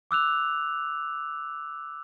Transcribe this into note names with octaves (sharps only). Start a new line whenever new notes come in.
D6 E6 F#6 F7